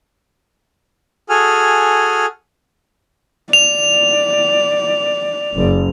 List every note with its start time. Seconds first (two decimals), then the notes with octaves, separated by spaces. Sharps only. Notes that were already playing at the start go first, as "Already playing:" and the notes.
1.30 F#4 G#4 A4 G#5 F6
3.53 D5 F7
5.55 F#1